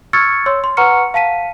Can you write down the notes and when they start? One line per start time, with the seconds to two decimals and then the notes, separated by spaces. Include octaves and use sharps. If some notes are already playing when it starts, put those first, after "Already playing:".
0.13 C#6 E6 F6 G#6 A6 C#7
0.46 C#5 C6 E6
0.64 C6
0.77 B4 F#5 A#5 C#6 F6 C#7
1.14 F5 A5 B6 D#7